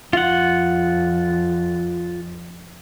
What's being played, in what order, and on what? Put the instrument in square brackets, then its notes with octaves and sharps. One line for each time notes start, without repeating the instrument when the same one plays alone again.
[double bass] F2 [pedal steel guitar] F4 F#5